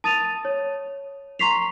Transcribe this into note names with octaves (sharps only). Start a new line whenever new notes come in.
A5 D#6 A6 D#7 F7
C#5
A#5 C6 C#6 B6 C7 F7